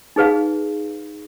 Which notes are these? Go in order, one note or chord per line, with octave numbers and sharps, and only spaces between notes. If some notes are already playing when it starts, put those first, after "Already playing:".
D#4 G#4 B4 F5